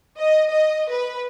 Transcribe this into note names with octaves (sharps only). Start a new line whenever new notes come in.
D#5
D#5
B4